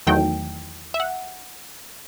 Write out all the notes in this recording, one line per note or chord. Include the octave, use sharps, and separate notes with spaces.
E2 D#3 F#3 A3 G5
E5
F#5